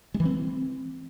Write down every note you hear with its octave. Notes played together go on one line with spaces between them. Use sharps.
G#3
E3
C4